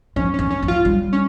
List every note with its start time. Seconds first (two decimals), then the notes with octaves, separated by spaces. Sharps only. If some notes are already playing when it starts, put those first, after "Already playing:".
0.16 F3 C#4
0.34 E3 C#4
0.50 C#4
0.63 F3
0.68 F4
0.85 G3
1.13 C#4